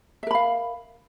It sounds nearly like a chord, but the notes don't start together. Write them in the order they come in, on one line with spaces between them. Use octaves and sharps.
E5 A#4 B5 F5